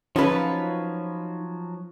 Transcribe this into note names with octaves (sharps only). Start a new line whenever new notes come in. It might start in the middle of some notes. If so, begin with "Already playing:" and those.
F3 F#3 C#4 D#4 F4 B4